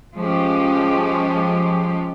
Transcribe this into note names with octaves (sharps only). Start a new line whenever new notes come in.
F3 G#3 C#4 G4